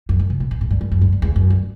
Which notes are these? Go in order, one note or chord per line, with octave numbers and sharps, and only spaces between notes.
F#2
G2
C3
B2
A2
A2
G2
F#2
F#2
G2
G2
E2
F#2
G2